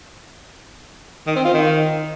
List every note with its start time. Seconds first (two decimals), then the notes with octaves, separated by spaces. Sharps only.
1.27 D#3
1.36 C4
1.45 F4
1.54 D#3